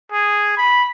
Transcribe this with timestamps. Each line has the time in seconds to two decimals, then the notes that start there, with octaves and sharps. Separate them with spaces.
0.12 G#4
0.57 B5